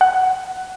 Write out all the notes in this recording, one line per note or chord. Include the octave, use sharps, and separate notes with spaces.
F#5